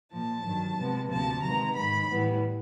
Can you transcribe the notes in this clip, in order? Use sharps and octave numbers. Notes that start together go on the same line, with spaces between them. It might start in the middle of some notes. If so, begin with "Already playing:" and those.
A#2 F3 A#3 A5
G2 D#3 F#3
C3 F3 G#3 B3
D2 C3 F3 A#3 A5
C3 D#3 G#3 B3 A#5
G#2 D#3 G#3 B5
A2 E3 G3 B3